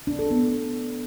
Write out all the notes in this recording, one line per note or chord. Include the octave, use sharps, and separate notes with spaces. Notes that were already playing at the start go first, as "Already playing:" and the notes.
D4
A4
B3